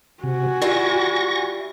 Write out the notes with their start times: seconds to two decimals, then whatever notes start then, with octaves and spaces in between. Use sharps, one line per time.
0.24 C3 F#4 G#5
0.62 G3 E4 F4 C#6 A#6